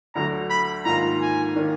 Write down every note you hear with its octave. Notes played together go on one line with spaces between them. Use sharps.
D2 D3 F#3 A#5
B5
G#2 D#3 A#3 F4 A#5
G#5
D#3 A#3 D4